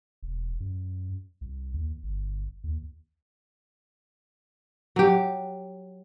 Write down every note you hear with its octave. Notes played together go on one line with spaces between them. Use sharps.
E1
F#2
C2
D#2
G1
D#2
F#3 G4